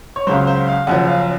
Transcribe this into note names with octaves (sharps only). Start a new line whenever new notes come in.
C#5
C#2 C#3 F#3 C5
C5
F5
F#1 F#2 F3 F#5
F5